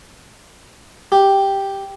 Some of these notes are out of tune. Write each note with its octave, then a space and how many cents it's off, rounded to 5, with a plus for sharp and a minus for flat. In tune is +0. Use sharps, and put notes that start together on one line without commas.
G4 +0